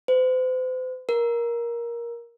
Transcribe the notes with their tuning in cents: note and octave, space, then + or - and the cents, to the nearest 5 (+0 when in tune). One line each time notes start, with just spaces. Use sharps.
C5 -40
A#4 +15